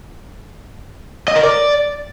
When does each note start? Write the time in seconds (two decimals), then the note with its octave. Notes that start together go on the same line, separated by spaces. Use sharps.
1.28 D#5
1.36 A#4
1.43 D5